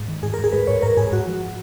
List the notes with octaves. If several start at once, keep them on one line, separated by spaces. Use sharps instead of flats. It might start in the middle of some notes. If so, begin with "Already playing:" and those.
Already playing: G#2
D#3
G#2 G#4
A#4
G#2
G#4
G#2 B4
G#2 C#5
G#2 A#4
G#2 G#4
G#2 F#4
F3